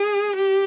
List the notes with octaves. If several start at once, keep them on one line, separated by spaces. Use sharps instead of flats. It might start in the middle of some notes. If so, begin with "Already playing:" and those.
Already playing: G#4
G4